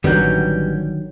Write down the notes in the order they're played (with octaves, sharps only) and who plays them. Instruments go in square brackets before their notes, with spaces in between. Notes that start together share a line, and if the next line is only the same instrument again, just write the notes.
[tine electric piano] A1 G6 [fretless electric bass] D3 D#3 F#3 [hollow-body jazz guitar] G3 B3 C#4